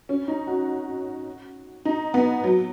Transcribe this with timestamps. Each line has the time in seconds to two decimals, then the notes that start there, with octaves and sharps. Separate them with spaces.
0.09 C#4
0.28 D#4
0.47 F#4
1.85 D#4
2.14 B3
2.44 F#3